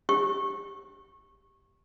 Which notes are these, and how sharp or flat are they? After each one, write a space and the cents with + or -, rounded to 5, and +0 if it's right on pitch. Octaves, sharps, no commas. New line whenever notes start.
G4 +0 C#6 -20